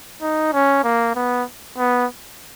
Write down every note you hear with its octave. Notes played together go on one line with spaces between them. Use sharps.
D#4
C#4
A#3
B3
B3